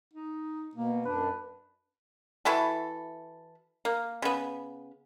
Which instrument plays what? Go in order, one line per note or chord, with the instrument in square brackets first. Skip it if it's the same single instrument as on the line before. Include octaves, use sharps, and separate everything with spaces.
[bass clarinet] D#4
[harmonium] B2 [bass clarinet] A#3
[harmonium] F#2 D4 [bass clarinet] B4
[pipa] E3 E4 F#4 A4
A#3
C#3 B3